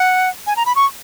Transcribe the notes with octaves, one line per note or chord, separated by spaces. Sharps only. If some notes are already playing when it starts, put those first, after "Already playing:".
Already playing: F#5
G#5
A#5
B5
C#6